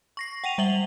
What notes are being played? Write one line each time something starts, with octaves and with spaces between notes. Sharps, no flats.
C#6 A#6 C7
F#5 G5 D#7 F7
G3 E5 F#7 G7